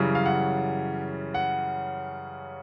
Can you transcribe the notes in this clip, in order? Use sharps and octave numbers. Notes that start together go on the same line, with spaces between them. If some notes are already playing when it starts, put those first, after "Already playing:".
Already playing: F#2 C#3 E3 G3
F5
F#5
F#5